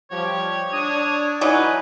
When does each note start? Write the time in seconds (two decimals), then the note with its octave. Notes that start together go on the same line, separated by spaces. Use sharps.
0.11 F3 G3 G4 C#5
0.73 D4 D#6
1.41 E3 F#3 D#4 B4 G#5